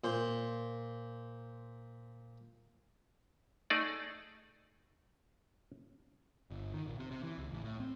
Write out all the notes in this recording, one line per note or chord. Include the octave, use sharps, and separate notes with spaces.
A#2 C5 C6
A3 D#4 G#4 D5
G1
D#3
A#1
C3
C3
E3
C#2
A1
A2
C4